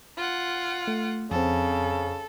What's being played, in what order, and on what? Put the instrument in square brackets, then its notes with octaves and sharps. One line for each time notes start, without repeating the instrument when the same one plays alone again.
[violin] F4 F#5
[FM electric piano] A3
[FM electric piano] F2 C4 [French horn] C#3 [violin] A4